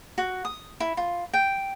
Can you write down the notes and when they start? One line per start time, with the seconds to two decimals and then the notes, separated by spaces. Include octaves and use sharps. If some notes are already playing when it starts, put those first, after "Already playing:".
0.18 F#4
0.45 D#6
0.80 E4
0.97 F4
1.33 G5